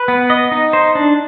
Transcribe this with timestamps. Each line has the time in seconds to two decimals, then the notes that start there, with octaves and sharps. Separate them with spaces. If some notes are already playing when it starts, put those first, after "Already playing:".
Already playing: B4
0.08 B3
0.30 D#5
0.52 D#4
0.73 C5
0.95 D4